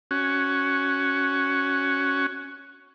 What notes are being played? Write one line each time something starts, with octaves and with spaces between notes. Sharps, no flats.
C#4 F#4